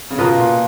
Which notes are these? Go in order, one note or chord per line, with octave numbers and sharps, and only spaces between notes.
C#3
B2 A#3 F4 B4 D#5
A#2